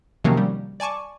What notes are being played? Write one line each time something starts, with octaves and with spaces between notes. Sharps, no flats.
C3 D#3 F3 F#3 A#3 C#4
G3
D5 G#5 A5 C#6 D6